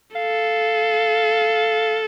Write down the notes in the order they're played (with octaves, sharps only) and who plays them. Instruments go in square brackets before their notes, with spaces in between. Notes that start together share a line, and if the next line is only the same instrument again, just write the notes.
[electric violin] A4 [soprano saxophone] F5